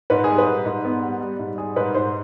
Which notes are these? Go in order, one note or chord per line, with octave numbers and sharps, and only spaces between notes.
G#2 B4
G#4
G3
B4
G#2
G#2
B3
G3
G3
G#2
G3 G#4
G#2 B4
G#2 C5